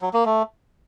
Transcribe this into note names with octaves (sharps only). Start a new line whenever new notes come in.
F#3
A#3
A3